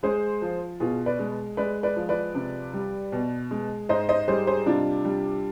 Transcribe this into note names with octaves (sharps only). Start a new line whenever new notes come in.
G#3 G#4 C5
F3
B2 F4 G#4
B4 D5
G#3
G#3 B4 D5
B4 D5
F3
B4 D5
C3
G3
B2
G#3
G#2 C5 D#5
C5 D#5
G3 G#4 C5
G#4 C5
C3 D4 F4
G3